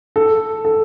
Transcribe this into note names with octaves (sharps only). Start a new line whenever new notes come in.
A4
A4